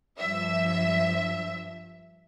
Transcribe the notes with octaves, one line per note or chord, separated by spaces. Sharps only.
G2 F3 E5